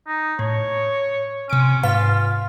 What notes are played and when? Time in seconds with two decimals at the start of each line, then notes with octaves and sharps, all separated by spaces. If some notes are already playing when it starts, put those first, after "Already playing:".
0.07 D#4
0.39 A2 C#5
1.50 C3 C#4 D7
1.83 G#2 F4 B4 F5
2.29 F5